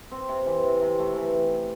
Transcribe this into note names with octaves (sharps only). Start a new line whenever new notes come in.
C4
C3
E3
C3
C3
A3
E3